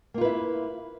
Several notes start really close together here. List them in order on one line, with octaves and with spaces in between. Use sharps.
A#3 F4 B4 E4